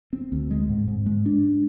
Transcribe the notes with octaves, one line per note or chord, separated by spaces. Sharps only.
C4
D2
G#3
G#2
G#2
G#3
D4